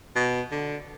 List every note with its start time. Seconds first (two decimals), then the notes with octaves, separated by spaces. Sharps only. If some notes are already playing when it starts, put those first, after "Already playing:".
0.16 B2
0.51 D3